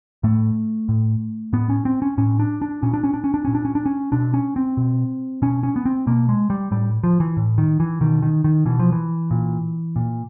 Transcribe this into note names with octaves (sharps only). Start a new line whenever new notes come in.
A2 A3
A2
A2 B3
C#4
C4
C#4
A2 C#4
D4
D4
A#2 C#4
D4
C#4
D4
C#4
D4
A#2 C#4
D4
C#4
D4
C#4
B2 D4
C#4
C4
B2
B2 C#4
C#4
B3
C4
B2 A#3
G#3
G3
A2 G3
F3
E3
A2
D#3
E3
B2 D#3
D#3
D#3
B2 E3
F3
E3
A#2
A#2